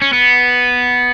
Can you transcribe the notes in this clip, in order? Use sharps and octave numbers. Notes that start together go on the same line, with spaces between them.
C#4
B3